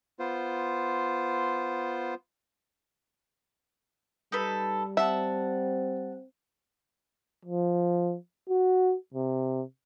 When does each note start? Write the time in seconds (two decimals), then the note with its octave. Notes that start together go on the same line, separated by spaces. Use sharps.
0.19 B3 F4 C5
4.32 G3 D#4 A4 B4
4.97 C4 E5 F#5 A5
7.45 F3
8.49 F#4
9.14 C3